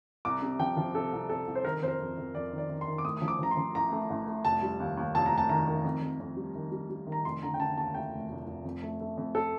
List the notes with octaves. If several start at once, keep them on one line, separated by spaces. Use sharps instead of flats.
C2 D6
C3
F3 G5
F3
C3 A4
C2
C2 A4
C2
C5
D#3 A#4
F2 C5
A#4
F2
F2
F2 D5
D#3
D5
D#3
C6
D#3
D6
A2 D#6
F3 D#6
D6
F3 A#5
C6
F3
A1 A#5
A3
A1
A3
F1 A5
G3
D#2
D#2
F1 A5
A#5
F1
A5
D#3 A#5
D#3
F2
F2
F2
G3
D#3
G3
G3
D#3
A#5
F1 C6
D3 A#5
G5
D3 A5
D#2 A5
A3 G5
F1
F1
F1
F2
A3
A3
F2
A4